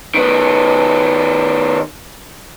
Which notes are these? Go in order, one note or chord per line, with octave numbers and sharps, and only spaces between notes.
D#3 B3